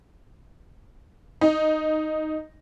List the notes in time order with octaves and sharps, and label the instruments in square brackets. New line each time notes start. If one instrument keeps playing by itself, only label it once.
[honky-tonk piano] D#4